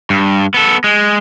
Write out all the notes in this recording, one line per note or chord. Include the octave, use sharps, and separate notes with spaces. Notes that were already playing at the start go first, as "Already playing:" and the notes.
G2
B3 A4
G#3